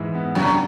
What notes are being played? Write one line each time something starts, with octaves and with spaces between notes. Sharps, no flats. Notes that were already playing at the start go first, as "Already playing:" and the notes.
Already playing: G#2 E3 G#3 E4
B3
F#2 C#3 F#3